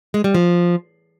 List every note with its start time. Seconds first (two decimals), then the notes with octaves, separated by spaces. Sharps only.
0.14 G#3
0.24 G3
0.35 F3